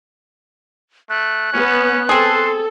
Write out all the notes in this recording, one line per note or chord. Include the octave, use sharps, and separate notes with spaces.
A3 F#6
B3 C#4
C4 G#4 A4 C6